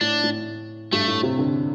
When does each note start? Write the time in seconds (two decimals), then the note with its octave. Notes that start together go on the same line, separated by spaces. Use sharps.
0.01 A2 D4
0.24 A2
0.92 G2 A3
1.08 A2
1.23 C3
1.39 D3